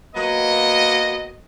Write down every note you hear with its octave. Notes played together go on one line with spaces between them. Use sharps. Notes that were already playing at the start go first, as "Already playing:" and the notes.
F#3 A#3 B3 D#5